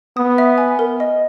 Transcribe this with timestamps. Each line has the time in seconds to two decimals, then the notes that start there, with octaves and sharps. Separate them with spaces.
0.17 B3 D#6
0.38 E5
0.58 G#5
0.79 A#4
1.00 D#5